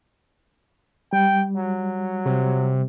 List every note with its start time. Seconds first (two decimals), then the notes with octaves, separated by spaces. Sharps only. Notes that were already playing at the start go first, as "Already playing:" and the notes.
1.13 G3 G5
1.57 F#3
2.25 C3